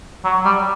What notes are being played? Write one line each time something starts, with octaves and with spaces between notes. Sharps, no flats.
F#3
G3